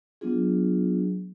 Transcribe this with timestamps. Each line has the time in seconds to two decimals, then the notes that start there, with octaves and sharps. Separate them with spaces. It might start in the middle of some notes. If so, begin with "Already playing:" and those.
0.21 F#3 B3 D4 F4 G#4